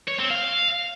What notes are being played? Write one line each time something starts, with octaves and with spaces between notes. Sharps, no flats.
C#5
C4
F5